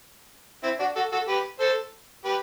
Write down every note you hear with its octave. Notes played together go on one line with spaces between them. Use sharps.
C4 E4
D4 F#4
F#4 A4
F#4 A4
G4 B4
A4 C5
G4 B4